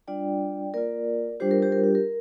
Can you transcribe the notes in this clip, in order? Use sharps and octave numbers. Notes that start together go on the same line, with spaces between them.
G3 D4 F4 D5 G5
A#3 F4 A#4 D5
G3 D4 F4 G4 C5
A#4
G4 C5
A#4
G4
A#4